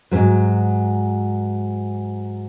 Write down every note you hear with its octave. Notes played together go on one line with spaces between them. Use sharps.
G#2 F#3